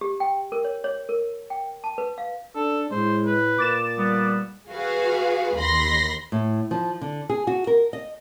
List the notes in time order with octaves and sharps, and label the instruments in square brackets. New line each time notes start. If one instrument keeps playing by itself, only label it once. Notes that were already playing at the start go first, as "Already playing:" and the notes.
[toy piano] G4
G5
A#4
C#5
C#5
A#4
G5
A5
B4
F5
[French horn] D4 [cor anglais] A4
[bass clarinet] A2 [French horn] G#3 [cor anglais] C5
[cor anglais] B4
[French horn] A#2 [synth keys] D6 A6 E7
[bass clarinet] G3 [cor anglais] B3
[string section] F#4 G#4 B4 F5
D#2 B5 C6 A#6 C7
[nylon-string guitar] A2
F3
D3
G#4
F#4
A#4
D#5